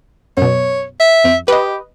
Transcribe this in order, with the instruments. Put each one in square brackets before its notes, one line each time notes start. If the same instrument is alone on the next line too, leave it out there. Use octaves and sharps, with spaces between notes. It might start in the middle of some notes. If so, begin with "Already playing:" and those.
[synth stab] F#2 B2 [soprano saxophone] C#5
[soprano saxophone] E5
[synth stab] F2
[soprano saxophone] G4 [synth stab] B4 D#5